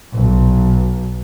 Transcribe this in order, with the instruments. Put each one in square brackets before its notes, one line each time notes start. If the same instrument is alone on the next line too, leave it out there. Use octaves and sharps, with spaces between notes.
[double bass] B1